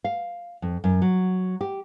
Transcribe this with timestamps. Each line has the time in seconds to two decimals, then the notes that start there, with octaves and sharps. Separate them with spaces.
0.04 F5
0.62 F2
0.84 F#2
1.02 F#3
1.61 G4